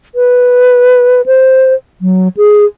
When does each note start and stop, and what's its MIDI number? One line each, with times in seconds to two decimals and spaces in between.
0.15 1.26 71
1.26 1.74 72
2.01 2.28 54
2.37 2.65 68